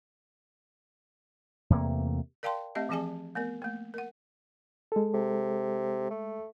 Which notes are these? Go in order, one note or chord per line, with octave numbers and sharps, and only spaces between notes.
E2 C3 A3 A#3
A#4 D5 F5 G5 A5 C6
A3 C4 G4 D#5 E5
E3 F3 C4 G#4 G#5 A5
A3 B3 A#4
A3 A#3
A#4 F#5
G#3 A4
C3
A3